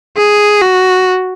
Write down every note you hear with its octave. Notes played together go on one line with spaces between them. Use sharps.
G#4
F#4